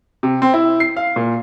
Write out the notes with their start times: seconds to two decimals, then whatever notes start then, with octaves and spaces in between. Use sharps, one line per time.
0.23 C3
0.42 C4
0.54 E4
0.80 C7
0.97 F5
1.16 A#2